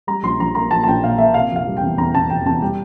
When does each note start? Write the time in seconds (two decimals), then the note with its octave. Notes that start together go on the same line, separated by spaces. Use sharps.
0.07 G3 A#5
0.23 A#1 C6
0.40 A#1 A#5
0.55 A#3 A#5
0.71 A#1 A5
0.84 A5
0.87 A#1 G5
1.03 A#2 F5
1.18 A#3 E5
1.34 C3 F5
1.51 F1 F5
1.67 G3
1.77 G5
1.82 E2
1.98 E2 A#5
2.15 E2 A5
2.29 F1 G5
2.46 E2 A5
2.62 G3 G5